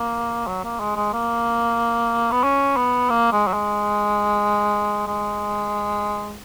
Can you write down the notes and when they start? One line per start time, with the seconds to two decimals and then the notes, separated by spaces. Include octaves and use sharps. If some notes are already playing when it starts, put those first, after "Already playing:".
Already playing: A#3
0.47 F#3
0.64 A#3
0.80 G#3
0.96 G#3
1.13 A#3
2.32 B3
2.44 C#4
2.76 B3
3.10 A#3
3.32 G#3
3.48 F#3
3.54 G#3
5.07 G#3